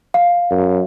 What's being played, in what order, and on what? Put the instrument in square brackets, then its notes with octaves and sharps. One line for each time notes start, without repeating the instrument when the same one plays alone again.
[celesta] F5
[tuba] F#2